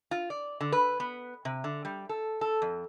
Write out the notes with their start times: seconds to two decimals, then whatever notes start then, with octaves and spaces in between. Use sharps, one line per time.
0.11 F4
0.30 D5
0.61 D3
0.72 B4
1.00 B3
1.45 C3
1.64 D3
1.85 G3
2.09 A4
2.41 A4
2.62 F2